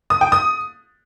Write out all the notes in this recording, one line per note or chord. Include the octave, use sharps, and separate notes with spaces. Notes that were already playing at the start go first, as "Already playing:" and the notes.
D#6
G5
D#6